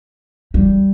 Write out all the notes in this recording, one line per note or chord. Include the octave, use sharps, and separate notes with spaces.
G3